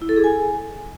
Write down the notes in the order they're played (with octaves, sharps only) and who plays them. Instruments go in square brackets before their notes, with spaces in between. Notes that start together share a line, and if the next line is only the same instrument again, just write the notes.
[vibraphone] E4
A4
G#4
G#5